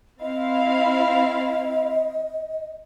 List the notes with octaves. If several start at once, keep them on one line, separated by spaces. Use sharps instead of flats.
C4 E4 D#5 F5